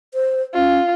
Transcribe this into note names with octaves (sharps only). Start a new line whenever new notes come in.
C5
C#4 F4